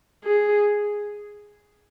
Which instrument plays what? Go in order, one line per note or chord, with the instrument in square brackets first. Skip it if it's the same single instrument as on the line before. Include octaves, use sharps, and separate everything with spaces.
[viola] G#4